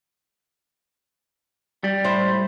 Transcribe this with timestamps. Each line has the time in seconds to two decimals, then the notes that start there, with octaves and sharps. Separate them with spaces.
1.84 G3
2.04 A2 E4 C5